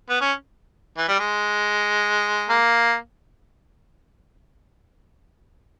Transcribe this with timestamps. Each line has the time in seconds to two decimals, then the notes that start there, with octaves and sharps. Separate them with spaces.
0.10 B3
0.21 C#4
0.97 E3
1.08 G3
1.19 G#3
2.50 A#3